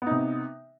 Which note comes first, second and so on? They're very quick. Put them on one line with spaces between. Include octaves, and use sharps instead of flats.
B3 D#4 C3